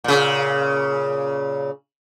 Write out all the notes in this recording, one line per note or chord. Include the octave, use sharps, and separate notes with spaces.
A#2 C#3